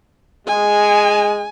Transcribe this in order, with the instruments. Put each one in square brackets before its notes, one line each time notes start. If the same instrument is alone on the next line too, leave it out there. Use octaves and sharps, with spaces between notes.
[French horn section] G#3 [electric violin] G#5